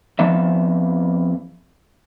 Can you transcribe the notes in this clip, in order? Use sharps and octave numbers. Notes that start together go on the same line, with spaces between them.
F2 F3 B3 E5